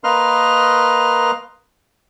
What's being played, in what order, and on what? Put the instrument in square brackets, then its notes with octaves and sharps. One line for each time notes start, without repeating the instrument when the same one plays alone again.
[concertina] A#3 A#4 B4 D#5 C6 F6